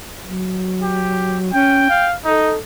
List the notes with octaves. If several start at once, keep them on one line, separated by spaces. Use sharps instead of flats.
F#3
G4
C#4 G5
F5
D#4 A4